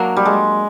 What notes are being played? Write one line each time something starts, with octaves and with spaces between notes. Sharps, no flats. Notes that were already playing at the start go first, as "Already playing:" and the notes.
Already playing: F#3 A#3 D4
G3
G#3